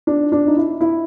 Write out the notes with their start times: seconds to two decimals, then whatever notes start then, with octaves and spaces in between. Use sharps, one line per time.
0.07 D4
0.32 D4
0.47 D#4
0.57 E4
0.81 E4